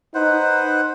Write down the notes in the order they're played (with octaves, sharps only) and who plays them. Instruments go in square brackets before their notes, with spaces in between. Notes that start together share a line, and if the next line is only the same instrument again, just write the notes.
[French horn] D#4 [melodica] B4 C5 F#5